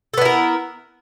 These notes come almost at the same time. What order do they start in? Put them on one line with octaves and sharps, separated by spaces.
A4 B3 E4 A#4